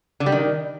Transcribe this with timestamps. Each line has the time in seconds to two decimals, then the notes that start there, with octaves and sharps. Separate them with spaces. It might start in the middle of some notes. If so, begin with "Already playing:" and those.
0.20 D3
0.26 G3
0.32 D#3